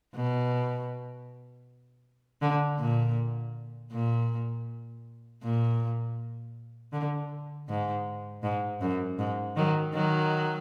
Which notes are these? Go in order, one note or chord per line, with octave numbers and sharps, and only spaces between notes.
B2
D3
A#2
A#2
A#2
D3
G#2
G#2
F#2
G#2
D#3 F#3
D#3 F#3